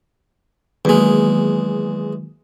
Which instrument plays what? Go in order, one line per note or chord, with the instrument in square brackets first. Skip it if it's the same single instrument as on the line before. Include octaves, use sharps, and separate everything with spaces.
[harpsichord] E2 G#3 [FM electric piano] D#3 F#3 A#3